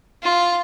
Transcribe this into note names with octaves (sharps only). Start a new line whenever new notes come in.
F4